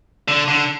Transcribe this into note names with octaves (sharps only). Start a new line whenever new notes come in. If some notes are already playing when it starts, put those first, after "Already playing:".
D3
D3